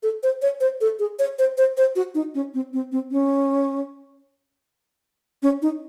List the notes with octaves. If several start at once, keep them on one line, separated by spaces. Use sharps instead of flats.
A4
C5
C#5
C5
A4
G#4
C#5
C5
C5
C5
F#4
D#4
C#4
C4
C4
C4
C#4
C#4
D#4